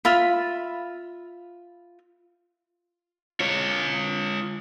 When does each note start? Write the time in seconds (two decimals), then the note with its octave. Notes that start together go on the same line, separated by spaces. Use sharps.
0.05 F4 E5 B5
3.40 F4 C#5